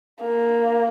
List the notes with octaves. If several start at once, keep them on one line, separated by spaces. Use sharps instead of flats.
A#3